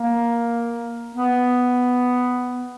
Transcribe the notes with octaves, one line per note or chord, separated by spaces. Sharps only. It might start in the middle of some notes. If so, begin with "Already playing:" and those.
Already playing: A#3
B3